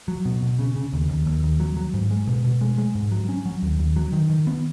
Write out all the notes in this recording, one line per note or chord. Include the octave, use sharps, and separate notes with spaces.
F#3
B2
B2
C#3
C#3
D#2
D#2
D#2
D#2
F#3
F#3
G#2
G#3
B2
B2
G#3
G#3
G#2
F#3
C#4
F#3
D#2
D#2
F#3
D#3
D#3
B3